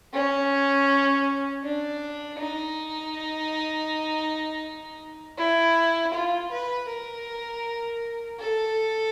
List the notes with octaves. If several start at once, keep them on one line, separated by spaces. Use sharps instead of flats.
C#4
D4
D#4
E4
F4
B4
A#4
A4